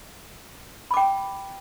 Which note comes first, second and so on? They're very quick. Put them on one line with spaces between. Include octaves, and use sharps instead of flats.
B5 D6 G5